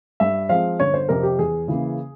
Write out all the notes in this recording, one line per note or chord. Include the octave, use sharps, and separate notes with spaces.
G2 E5
F3 G#3 C4 F5
G1 C#5
C5
F2 C3 A#4
G4
E2 G#4
C#3 E3 A#3